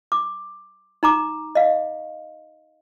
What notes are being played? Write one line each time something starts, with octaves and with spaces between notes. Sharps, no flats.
D6
D#4 A#5 D6
D#5 F5